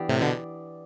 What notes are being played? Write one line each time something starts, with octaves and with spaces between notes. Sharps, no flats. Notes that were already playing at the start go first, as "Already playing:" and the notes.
Already playing: E3 B3 D4 G4 D5
A2 C3
B2 D3